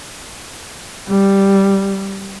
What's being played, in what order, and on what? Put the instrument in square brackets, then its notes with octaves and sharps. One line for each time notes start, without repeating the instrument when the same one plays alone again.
[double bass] G3